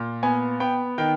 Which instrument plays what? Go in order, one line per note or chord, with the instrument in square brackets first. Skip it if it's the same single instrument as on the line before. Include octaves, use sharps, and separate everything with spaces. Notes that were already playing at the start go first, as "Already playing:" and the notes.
Already playing: [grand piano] A#2
B3 G#5
B3 G5
D#3 G5